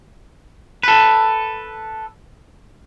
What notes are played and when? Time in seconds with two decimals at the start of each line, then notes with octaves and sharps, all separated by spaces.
0.83 A4 B4